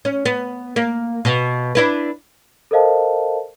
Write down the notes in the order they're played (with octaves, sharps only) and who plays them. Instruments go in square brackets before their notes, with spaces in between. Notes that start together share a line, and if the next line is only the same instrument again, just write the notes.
[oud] C#4
B3
A#3
B2
D4 E4 B4
[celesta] A4 A#4 C5 D#5 F5 A5